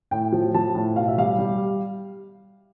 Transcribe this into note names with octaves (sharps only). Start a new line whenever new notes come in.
A2 G5
F3
F3 A5
A2
B2 F5
E5
G3 F5
G3